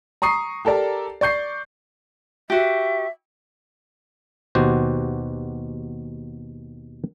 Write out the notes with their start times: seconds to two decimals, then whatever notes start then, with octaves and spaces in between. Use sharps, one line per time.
0.22 A#5 C#6 D#6 C7
0.65 G4 A4 A#4 D5 A#5
1.21 D5 C#6 G6 C7
2.50 F#4 G4 E5
4.55 D#2 B2 F#4 G4 C5